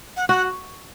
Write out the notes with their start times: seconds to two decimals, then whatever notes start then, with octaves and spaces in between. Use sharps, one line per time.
0.17 F#5
0.29 F#4 F#5